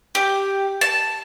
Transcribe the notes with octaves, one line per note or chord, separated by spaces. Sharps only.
G4
A5